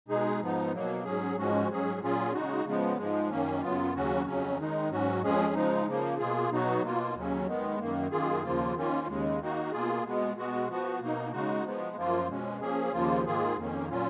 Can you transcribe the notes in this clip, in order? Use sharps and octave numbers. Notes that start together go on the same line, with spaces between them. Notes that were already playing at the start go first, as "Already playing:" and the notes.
B2 G#3 D#4 G#4
G#2 F3 B3 D#4
B2 F#3 A#3
G#2 F#3 C#4 G#4
G#2 F3 G#3 C#4 F#4
G#2 F#3 C#4 G#4
A#2 F#3 C#4 F4 G#4
C#3 G#3 D#4 F#4
C#3 F3 G#3 B3
G#2 F3 G#3
F#2 D#3 A#3 C#4
F#2 C#3 F#3 B3 F4
D#2 C#3 F#3 C#4 F#4
F2 C#3 F#3 C#4
D#3 G#3 D#4
G#2 F#3 C#4 F#4
F2 F3 G#3 C#4 G#4
C#3 F3 G#3 D#4
C#3 F3 A#3
B2 A#3 F4 G#4
B2 F#3 B3 D#4 F#4
B2 A#3 F4
D#2 C#3 F#3 C#4
D#3 G#3 B3
F#2 D#3 A#3
F#2 D#3 A#3 F4 G#4
D#2 C#3 F3 A#3 F4
D#3 A#3 C#4 F4
D#2 C#3 G#3
D#3 A#3 D#4 F#4
B2 A#3 F4 G#4
B2 G#3 B3
B2 G#3 B3 F#4
F3 B3 F#4
B2 A#3 D#4
C#3 G#3 D#4 F#4
F3 G#3 B3
F#2 F3 A#3 F4
B2 G#3 C#4
F3 A#3 C#4 G#4
D#2 C#3 F3 A#3 F4
G#2 D#3 A#3 F4 G#4
F2 D#3 A#3 C#4
A#2 F#3 C#4 F4